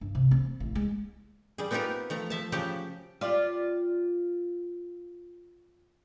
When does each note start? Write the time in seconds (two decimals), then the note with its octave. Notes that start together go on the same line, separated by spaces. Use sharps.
0.01 G2
0.15 C3
0.31 C4
0.60 A1
0.75 G#3
1.58 G3 G#4
1.71 B3 C4 D#4 F4 G4 A#4
2.10 F3 A3 A#5
2.30 F3 E5 A5
2.52 C#3 F3 F#3 G4 A5
3.21 F4 G4 D5